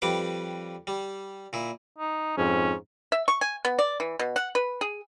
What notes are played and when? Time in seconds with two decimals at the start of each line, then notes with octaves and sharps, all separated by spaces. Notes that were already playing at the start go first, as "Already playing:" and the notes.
0.02 F2 G3 B4 D6
0.87 G3
1.53 A#2 E4
1.98 D#4
2.38 F2 G#2 C#4
3.12 E5
3.28 C#6
3.41 G#5
3.65 B3
3.79 D5
4.00 E3
4.19 B2
4.36 F#5
4.55 B4
4.81 G#4